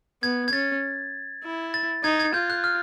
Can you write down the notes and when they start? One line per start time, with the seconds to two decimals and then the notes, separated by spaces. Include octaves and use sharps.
0.23 B3 G#6
0.48 G#6
0.52 C#4 A6
1.44 E4
1.74 A6
2.04 D#4 G#6
2.20 G#6
2.34 F4 G6
2.50 F#6
2.64 F6